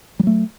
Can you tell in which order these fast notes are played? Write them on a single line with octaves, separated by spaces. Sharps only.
G3 F#3 A3